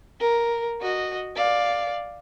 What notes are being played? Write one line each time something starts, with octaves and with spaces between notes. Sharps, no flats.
A#4
F#4 D#5
D5 F5